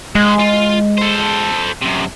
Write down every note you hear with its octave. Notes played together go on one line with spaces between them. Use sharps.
G#3 G#4 F#5
F4
A4 C5
F#2 C3